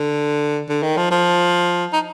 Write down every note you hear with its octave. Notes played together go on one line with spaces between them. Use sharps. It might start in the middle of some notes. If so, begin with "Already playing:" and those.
Already playing: D3
D3
D#3
F3
F3
D#4